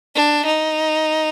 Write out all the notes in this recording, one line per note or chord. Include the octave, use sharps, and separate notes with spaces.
D4
D#4